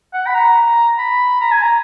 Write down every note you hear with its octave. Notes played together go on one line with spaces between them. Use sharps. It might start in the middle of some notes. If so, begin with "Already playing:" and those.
F#5
B5
A#5
B5
A#5
G#5
A#5